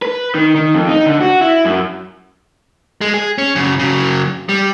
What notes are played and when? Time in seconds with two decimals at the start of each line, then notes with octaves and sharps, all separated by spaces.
0.02 B4
0.35 D#3
0.55 D#3
0.74 F2
0.89 D#4
1.06 D3
1.21 F#4
1.41 E4
1.65 F#2
3.01 G#3
3.14 G#4
3.38 C#4
3.56 F#2 C#3
3.79 C#3 F#3
4.49 G3